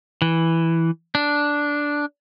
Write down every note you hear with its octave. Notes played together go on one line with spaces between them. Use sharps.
E3
D4